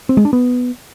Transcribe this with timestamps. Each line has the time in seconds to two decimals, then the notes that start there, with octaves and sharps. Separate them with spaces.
0.09 C4
0.17 G#3
0.25 D4
0.33 B3